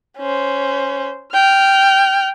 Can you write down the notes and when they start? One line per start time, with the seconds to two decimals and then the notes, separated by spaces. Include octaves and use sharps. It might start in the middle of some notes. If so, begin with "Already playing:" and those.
0.18 C#4 C5
1.34 G5 F6